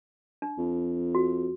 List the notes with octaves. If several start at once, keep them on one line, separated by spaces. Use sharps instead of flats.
D4
F2
F#4